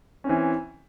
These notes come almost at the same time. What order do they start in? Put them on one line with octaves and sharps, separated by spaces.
C#4 C4 E3